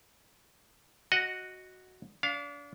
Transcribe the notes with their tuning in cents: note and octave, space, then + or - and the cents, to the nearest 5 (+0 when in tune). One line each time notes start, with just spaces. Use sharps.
F#4 +0 D#5 +0 F#5 +0
D4 -35 F5 +0